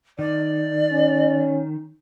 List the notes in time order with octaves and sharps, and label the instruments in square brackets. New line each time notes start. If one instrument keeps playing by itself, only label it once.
[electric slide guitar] D#3 [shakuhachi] D5
[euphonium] C#4